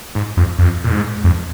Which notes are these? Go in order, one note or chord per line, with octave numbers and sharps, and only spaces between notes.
G#2
F2
F2
A#2
G#2
F2